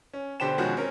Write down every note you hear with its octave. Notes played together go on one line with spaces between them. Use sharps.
C#4
B2 D3 G4 C5 G5 E7
B2 D#3 F3 G#3 C#4 F#4
C4 C#4 A#4